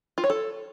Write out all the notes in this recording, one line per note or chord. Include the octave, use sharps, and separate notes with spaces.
F4
C#5
A4